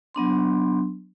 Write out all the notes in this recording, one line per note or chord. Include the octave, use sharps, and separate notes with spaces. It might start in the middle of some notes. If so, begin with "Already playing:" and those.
F#3 B3 D4 C6